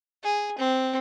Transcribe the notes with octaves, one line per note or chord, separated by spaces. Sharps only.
G#4
C4